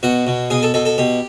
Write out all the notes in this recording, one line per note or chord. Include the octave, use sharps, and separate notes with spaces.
B2 F#4
B2
B2 G#4
A4
B2 A4
A4
B2 G4